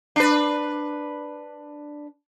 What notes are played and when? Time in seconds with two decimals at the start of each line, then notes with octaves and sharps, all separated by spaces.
0.16 D4 B4